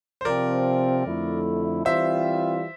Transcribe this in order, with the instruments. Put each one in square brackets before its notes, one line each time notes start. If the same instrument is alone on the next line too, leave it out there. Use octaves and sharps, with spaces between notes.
[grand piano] C5
[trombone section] C3 F3 C4 [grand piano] A#4 D5
[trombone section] F2 D3 A3 E4
[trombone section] E3 G3 C4 F4 [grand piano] C5 E5